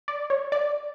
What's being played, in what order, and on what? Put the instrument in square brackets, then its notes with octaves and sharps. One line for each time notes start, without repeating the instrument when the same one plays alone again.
[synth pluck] D5
C#5
D5